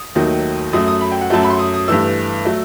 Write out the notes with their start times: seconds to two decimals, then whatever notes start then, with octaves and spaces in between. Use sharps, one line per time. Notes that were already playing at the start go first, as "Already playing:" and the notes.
Already playing: D#6
0.15 D#2 D#3 F#3 A3
0.73 F#2 F#3 A3 D#6
0.87 D#6
1.01 B5
1.12 G5
1.21 F#5
1.30 F#2 F#3 A3 A5
1.43 B5
1.50 C6
1.59 D#6
1.74 D#6
1.88 G2 E3 A3 E6
2.45 F#3 A3